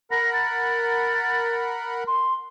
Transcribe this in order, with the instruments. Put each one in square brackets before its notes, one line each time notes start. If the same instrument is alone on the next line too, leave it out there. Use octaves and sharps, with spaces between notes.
[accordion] A#4 F#5 B5 [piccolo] A#6
[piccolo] A6
C6